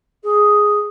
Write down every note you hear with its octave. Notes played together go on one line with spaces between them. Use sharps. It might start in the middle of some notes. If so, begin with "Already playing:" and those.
G#4